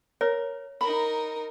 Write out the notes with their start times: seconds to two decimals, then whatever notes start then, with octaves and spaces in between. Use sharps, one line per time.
0.21 A#4 C#5
0.81 D#4 A#4 B5